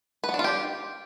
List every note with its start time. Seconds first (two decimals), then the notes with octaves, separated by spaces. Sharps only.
0.24 B4
0.29 B3
0.34 D4
0.39 F4
0.44 G4